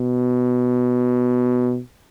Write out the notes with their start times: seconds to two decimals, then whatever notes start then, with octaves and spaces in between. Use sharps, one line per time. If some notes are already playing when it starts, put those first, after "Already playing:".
Already playing: B2